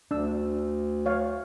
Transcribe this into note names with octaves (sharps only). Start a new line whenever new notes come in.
D2 D4 E6
C#5 F5